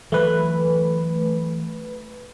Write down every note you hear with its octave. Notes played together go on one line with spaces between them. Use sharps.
E3 F#3 A3 B4